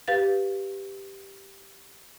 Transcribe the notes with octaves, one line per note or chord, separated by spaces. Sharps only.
G4 B4 F5 A6